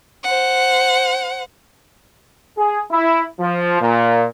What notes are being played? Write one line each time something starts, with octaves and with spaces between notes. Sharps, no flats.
C5 F#5
G#4
E4
F3
A#2